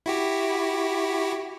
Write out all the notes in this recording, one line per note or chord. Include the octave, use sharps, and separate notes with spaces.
E4 F#4 G4